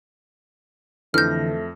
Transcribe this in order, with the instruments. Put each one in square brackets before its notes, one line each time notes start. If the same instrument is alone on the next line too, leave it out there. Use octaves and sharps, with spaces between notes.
[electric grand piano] F2 A#6 [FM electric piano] D3 E3 [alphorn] A3 [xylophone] F6 G6